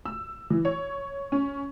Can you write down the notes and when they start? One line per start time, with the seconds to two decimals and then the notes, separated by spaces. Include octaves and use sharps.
0.05 E6
0.50 E3
0.65 C#5
1.32 C#4